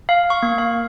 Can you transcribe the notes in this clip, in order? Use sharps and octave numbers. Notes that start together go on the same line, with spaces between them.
F5
C#6
A#3
F5